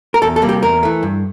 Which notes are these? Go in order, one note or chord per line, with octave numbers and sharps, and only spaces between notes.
A#4
E2 A4
A4
C3 G3 A#3
G4
E2 A#4
E3 A3
G2